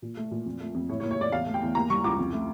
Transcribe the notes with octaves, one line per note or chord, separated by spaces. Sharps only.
A#2
A3
A#2
F2
A3
F2
A2 C#5
C#5
A#3
C#5
A2 D5
E2 F5
A3
G5
E2
A#3 A#5
G3 C#6
C#2 D6
F2
A3